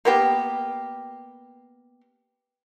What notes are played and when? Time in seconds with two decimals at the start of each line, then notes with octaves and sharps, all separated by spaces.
0.05 A#3 B3 G4